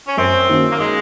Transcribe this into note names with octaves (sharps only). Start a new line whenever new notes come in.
C#4
F#2 C4
D#3 A#3 C#4 F#4
A#3
G#3